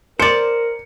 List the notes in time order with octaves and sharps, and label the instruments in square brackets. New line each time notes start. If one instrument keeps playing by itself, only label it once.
[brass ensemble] A#4 [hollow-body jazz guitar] C5 D5 [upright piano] C#7